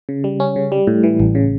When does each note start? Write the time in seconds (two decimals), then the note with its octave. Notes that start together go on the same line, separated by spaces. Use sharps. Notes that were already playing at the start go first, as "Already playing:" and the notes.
0.09 C#3
0.24 G3
0.40 C#4
0.56 C#3
0.72 G3
0.87 A2
1.03 E3
1.20 A1
1.35 C#3